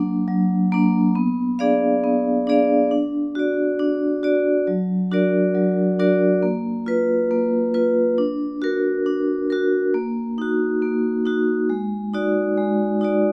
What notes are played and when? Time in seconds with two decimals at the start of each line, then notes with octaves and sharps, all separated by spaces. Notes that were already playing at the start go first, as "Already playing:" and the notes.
Already playing: F#3 A#3 D4
0.28 F#3
0.72 A#3 D4
1.15 B3
1.59 D4 G#4 D5 F5
2.04 B3
2.47 D4 G#4 D5 F5
2.91 D4
3.35 F#4 D5
3.79 D4
4.23 F#4 D5
4.67 F#3
5.11 D4 F#4 A#4 D5
5.55 F#3
5.99 D4 F#4 A#4 D5
6.43 A#3
6.86 F4 B4
7.31 A#3
7.74 F4 B4
8.18 D4
8.62 F#4 A#4
9.06 D4
9.50 F#4 A#4
9.94 A#3
10.38 D#4 F#4
10.82 A#3
11.26 D#4 F#4
11.70 G#3
12.14 D#4 F#4 D5
12.57 G#3
13.01 D#4 F#4 D5